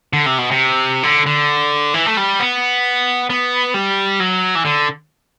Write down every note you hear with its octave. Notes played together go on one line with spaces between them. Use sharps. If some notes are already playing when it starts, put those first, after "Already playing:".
D3
C3
B2
C3
D3
D3
E3
A3
G3
B3
B3
G3
F#3
E3
D3